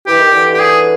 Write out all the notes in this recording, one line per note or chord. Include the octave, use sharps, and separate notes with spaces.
E3 G4
D#3
D3 E3
G4
G#4